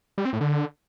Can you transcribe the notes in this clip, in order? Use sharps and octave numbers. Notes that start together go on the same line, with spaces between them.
G3
C4
A2
D3